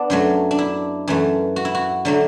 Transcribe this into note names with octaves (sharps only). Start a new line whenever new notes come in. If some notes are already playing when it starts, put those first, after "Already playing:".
Already playing: B3 D4
F#2 F#3 A3
D4
E4
F#2 E3 A3
F#4
E4
F#4
D3 F#3 A3